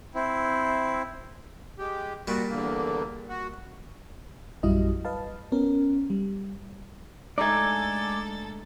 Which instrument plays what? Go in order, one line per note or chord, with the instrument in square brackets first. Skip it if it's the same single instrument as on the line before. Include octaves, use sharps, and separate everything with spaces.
[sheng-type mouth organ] C4 E4
[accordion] G#3 G4
[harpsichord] A#2 G3 [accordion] F#4
[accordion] E2 D3 A#3
F#4
[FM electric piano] A#1 F#2 G3 E4 F#4 D#5
B4 D#5 F5 A5
B3 C#4 A#4
G3
[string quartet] G#3 A4 A6 [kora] A3 D4 D#4 [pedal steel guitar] D5 G#5